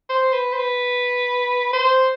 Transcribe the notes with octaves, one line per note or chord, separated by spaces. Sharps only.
C5
B4
C5
B4
C5